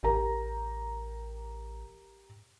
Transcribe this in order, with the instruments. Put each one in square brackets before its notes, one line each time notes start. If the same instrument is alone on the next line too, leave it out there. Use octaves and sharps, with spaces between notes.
[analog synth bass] A1 [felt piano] G4 A#4 A#5